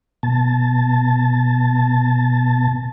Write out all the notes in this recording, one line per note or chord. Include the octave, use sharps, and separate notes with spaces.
B2 A5